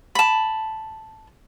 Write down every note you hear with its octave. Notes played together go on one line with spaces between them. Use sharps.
A5 B5